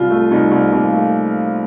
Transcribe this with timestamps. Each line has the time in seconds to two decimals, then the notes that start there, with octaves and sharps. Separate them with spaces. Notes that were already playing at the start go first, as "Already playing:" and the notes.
Already playing: C2 F4
0.11 A3
0.31 C2 D#4
0.51 C2
0.72 C2 A#3
0.92 A3